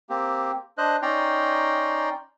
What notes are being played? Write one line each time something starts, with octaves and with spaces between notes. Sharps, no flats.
A#3 C4 G4
D4 C5 D#5 F#6
C#4 D#4 D5 G5 A#5 C6